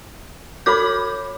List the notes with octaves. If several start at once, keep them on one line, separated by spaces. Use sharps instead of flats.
F#4 C#5 B5 D6 G6